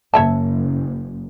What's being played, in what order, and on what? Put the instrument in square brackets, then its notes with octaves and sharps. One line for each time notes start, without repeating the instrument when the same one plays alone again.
[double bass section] F#1 [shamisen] C#5 E5 A5